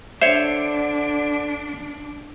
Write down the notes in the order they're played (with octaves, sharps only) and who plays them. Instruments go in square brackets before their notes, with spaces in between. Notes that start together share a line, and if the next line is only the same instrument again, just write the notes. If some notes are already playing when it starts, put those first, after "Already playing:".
[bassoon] D3 [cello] D4 [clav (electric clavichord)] C5 C#5 [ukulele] E5